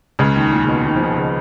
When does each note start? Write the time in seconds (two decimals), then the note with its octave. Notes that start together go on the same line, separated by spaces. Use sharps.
0.19 C#2 C#3
0.36 D#2 D#3
0.52 A#2
0.64 C#3
0.68 B2
0.85 D#2 D#3
0.96 F3
1.01 D#2 D#3
1.17 C#3